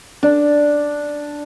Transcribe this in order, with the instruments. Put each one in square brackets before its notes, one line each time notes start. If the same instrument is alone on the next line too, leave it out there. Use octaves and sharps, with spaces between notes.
[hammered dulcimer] D4